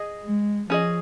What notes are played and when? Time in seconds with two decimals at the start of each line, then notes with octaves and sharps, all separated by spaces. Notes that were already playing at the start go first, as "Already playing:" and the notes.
Already playing: G#4 D#5
0.24 G#3
0.70 F3 C#4 G#4 D#5